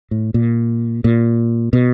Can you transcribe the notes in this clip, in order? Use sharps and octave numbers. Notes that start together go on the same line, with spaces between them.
A2
A#2
A#2
B2